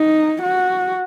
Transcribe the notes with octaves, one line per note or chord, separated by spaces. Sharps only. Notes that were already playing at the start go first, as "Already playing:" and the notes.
Already playing: D#4
F#4